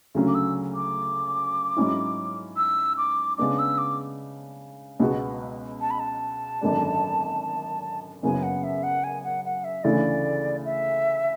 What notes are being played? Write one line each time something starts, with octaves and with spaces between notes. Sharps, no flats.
D2 C#3 F#3 C#4
D6
E6
D6
G#2 F#3 C#4 E4
E6
D6
C#3 G#3 B3 D4 D6
E6
D6
C#2 B2 G#3 B3 F#4
A5
B5
A5
G#1 F#2 D3 G#3 D4
F#1 F#2 C#3 F#3 B3 G#5
F#5
E5
F#5
G#5
F#5
F#5
E5
D2 C#3 E3 A3 E4 D5
E5